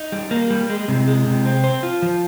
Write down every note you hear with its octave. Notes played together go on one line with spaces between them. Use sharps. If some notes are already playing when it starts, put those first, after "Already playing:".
Already playing: D#4
G3
A#3
G3
G#3
C3
G#3
C3
C4
C5
F4
F3